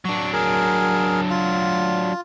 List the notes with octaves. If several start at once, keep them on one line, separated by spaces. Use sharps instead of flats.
F#3 D4 C#6
G#4 A#4
F4